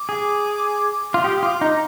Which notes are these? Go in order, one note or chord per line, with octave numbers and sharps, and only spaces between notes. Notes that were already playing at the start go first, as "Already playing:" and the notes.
Already playing: D6
G#4
F4
G4 D#6
D#6
F4 D6
D#4 A#5